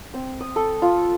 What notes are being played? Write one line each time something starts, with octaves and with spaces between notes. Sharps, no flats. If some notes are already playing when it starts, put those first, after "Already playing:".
C4
D#6
A4
F4